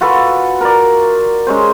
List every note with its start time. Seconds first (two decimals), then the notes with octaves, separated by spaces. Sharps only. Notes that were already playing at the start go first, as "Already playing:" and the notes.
0.01 F4 F#4 A4 B4
0.61 A#4 D5
1.47 G#3 C#4 C5